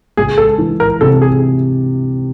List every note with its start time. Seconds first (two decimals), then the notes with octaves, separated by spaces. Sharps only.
0.17 C#2 G#4
0.38 A4
0.58 E3
0.80 A#4
1.01 C3 A4
1.22 G#4